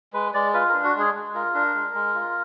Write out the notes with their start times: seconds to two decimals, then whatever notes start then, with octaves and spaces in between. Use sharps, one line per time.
0.13 G#3 B4
0.34 G#3 D5
0.53 F4 B4
0.69 D4 A#4
0.84 F#4
0.94 G#3 G#4
1.14 G#3
1.34 F4 A#4
1.54 D4 A#4
1.75 G#3
1.94 G#3
2.14 F4